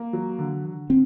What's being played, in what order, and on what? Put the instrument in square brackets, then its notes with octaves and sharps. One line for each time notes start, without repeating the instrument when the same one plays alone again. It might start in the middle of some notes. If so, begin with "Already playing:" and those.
Already playing: [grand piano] A#3
F#3
D3
D3
[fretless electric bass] C4